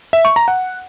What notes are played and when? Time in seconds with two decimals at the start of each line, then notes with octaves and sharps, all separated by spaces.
0.13 E5
0.25 C#6
0.36 A#5
0.48 F#5